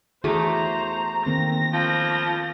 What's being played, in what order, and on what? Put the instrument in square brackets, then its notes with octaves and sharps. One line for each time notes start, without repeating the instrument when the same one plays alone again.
[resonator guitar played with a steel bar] E2 A3 [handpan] F#4 G#4 [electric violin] C5 A#5
[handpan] D#3 A#3 C4 [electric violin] A#6
[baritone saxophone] F3